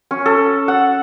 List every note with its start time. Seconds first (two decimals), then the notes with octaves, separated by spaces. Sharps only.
0.11 C#4
0.26 A4
0.68 F#5